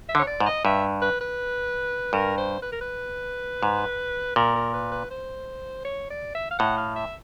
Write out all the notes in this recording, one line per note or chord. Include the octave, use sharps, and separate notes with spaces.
E5
D3
C#5
D5
G#2
D#5
G2 E5
B4
B4
G2 A#4
C5
B4
A#4
B4
G#2
A#2 A#4
A#4
B4
B4
C5
C#5
D5
E5
F5
A2 F#5
F5
E5